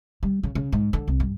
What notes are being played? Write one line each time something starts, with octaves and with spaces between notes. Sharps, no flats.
G3
C#3
C#3
G#2
D3
C2
G2